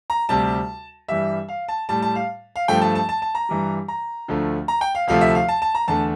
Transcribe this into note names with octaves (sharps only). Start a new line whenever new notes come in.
A#5
D2 C3 G3 A5
G2 E3 G3 E5
F5
A5
A2 G3 A5
A5
F5
F5
G2 F3 A3 G5
A5
A5
A5
A5
A#5
G2 E3 G3
A#5
D2 D3 F3 A3
A#5
G5
F5
D2 C3 F3 A3 F5
E5
F5
A5
A5
A#5
E2 D3 A3 A5